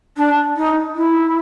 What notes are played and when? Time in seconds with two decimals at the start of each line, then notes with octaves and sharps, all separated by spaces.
0.16 D4
0.56 D#4
0.95 E4